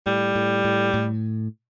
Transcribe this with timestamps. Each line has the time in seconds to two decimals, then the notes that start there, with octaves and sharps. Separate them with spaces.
0.06 A2 G3
0.35 A2
0.65 A2
0.94 A2